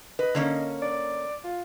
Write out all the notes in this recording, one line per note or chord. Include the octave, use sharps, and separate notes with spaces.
B4 D#5
D3 A#3 C#4
D5
F4